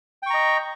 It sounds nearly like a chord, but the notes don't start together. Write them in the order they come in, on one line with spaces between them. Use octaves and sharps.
G5 C#6 A#5 D#5